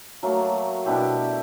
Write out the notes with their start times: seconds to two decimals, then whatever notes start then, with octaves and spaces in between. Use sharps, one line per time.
0.23 F#3 A3 A#3
0.86 B2 D4 E4 G4